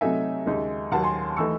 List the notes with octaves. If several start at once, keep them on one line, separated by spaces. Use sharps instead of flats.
C3 F#3 A3 D#4 E5 G#5
D#2 C#3 G#3 D#4
D#2 D#3 F#3 F#5 A5
G#5 C6
E3 A3 D#4 C#6 E6